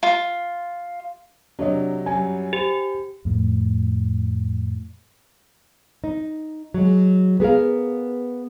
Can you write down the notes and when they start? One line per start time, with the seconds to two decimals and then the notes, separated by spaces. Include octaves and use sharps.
0.03 F4
1.59 C3 F#3 D4 C#5 D#5
2.06 F#2 F#3 G3 G#5
2.53 G4 C5
3.25 F2 A2
6.04 D#4
6.74 F#3 G#3
7.40 B3 G#4 A#4 F5